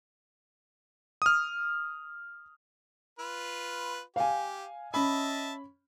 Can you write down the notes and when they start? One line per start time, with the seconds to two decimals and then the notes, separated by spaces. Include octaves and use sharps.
1.22 D#6 F6
3.19 F4 B4
4.16 G4 F5 G#5
4.94 C#4 D#5 E5 A5 B5